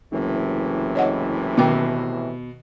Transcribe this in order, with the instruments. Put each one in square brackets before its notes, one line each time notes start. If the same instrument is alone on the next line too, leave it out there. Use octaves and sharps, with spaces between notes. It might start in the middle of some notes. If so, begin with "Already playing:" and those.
[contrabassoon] F#1 [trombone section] A2 C3 E3
[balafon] C#5 D#5 F#5
[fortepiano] B2 [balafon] D#3 G5 D6